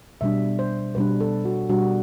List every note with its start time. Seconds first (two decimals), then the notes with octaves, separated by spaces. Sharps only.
0.21 B2 G3 D4 E5
0.59 C5
0.95 B2 G3 D4 B4
1.20 A4
1.45 F#4
1.69 B2 G3 D4 F#4